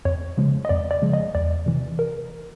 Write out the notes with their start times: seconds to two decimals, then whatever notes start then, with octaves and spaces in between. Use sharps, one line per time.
0.05 F2 C#5
0.37 C#3 F3 G#3
0.65 D#5
0.69 F2 D5
0.91 D5
1.02 C#3 F3 G#3
1.13 D#5
1.35 E2 D5
1.66 C3 E3
1.99 A#4